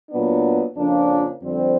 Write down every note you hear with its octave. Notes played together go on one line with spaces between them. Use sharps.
A#2 F#3 B3 D4
F2 C#3 F3 A#3 D4
F2 D3 G3 C4